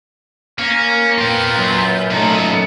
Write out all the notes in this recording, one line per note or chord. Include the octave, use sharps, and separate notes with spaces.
A#3 C#4
A#2 F4 B4 G5 G6
F#2
A#2 A3 B3 D#4 A4